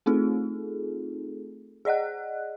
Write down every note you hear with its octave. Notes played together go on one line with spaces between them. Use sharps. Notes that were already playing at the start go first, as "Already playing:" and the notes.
A3 C4 D#4 F4 G#4 A4
G#4 D5 D#5 F#5 F#6